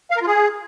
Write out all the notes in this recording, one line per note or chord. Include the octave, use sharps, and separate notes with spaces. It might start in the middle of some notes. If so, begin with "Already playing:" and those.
F5
A#4
F4
G#4